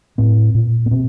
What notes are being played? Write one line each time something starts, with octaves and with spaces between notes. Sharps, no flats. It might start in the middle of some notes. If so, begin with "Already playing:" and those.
A2 C4
A#2
B3
B2 C4